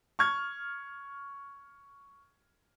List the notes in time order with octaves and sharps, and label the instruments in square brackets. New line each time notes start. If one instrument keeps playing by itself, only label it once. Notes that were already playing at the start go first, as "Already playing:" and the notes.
[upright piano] C#6 F6 G#6